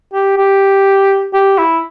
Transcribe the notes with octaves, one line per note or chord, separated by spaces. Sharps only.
G4
G4
G4
E4